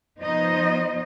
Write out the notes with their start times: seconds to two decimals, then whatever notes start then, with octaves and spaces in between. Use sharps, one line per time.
0.21 F3 B3 D#4 C5 D#5